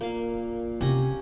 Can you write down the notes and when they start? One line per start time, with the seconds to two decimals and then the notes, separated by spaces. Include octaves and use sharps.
0.01 A#2 A#3 F5
0.81 C3 C#4 G4 A#5